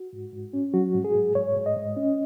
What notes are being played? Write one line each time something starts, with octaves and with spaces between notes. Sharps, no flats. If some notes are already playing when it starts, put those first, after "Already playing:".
Already playing: F#4
G#2
G#2
C#4
F#3 F#4
G#2
G#4
G#2
G#2 C#5
G#2
D#5
G#2
C#4